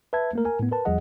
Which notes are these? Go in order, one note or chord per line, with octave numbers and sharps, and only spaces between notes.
B4 E5 A5 G#6
A3 A#3 A#4
A#4 G#5
A2 B3
A#4 B4 A5
E2 F3 G3 G#4 D#5 F#5